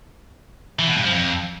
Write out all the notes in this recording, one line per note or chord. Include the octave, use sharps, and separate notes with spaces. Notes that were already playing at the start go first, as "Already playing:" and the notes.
E3
B2
G2
F3
F2